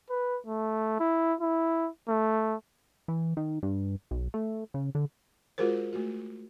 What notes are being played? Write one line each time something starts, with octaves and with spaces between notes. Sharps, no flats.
B4
A3
E4
E4
A3
E3
D#3
G2
B1
A3
C#3
D3
G#3 F4 F#4 G#4 A#4 C5
A3 F#4